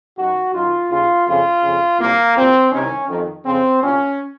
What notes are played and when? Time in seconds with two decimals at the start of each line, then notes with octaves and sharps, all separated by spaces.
0.17 F#2 D#3 F#4
0.53 F#2 D#3 F4
0.89 D#2 C#3 F4
1.25 F2 C#3 F4
1.63 F2 C#3
1.98 C2 A#2 A#3
2.36 C2 A#2 C4
2.71 C2 C3 D#3 C#4
3.08 F2 D#3
3.44 F2 C#3 C4
3.81 C2 A#2 C#4